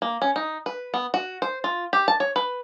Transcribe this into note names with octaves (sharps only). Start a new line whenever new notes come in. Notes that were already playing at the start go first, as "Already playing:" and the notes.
A#3
C#4
D#4
B4
B3
F#4
C5
F4
G4
A5
C#5
B4